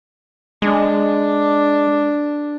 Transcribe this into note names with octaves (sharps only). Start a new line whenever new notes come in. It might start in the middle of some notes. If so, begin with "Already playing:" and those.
G#3 D4